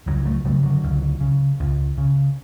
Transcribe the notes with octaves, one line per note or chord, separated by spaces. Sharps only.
C#2 D3 F#3
F#3 A3
C#3 F#3 A3
D3 F#3
C#2
C#3
C#2
C#3